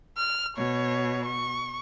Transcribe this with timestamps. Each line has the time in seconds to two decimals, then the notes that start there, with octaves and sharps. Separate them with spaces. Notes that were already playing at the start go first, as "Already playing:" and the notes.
0.18 F6
0.57 B2 C#5
1.25 C#6